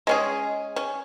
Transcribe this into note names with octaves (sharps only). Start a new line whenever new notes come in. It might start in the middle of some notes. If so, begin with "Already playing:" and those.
G#3 C#4 G#4
C#4